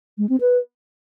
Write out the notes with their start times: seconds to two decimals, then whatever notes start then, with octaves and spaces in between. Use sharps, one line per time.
0.18 G#3
0.29 C4
0.41 B4